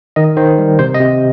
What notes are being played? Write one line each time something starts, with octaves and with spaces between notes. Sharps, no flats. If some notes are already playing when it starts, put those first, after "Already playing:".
D#3 D#5
D#3 C5
G3
C3 C5
D#5
C3